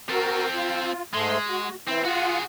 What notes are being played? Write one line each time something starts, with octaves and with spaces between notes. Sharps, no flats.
C4 F#4 A4 A#4
F4
G#2 G#3 A3 C6
F#4
E3 C4 E4
F4 F#4 G#4 F#5